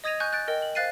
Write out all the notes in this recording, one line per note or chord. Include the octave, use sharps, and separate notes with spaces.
D#5 D#6 G#6 A#6 D#7 F7
G#5 C#6 F#6 G6 D#7
F#6 A6 D7
A#4 D#5 G5
F#7
C5 F5 F#6 A6 C7 D#7